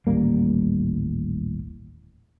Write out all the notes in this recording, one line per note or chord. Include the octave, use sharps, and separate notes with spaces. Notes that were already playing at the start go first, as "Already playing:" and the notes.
D#1 A1 G3 A#3